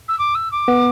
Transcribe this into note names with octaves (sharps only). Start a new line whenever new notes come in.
E6
D6
E6
D6
B3